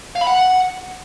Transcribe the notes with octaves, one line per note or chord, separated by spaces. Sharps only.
F5
B5
F#5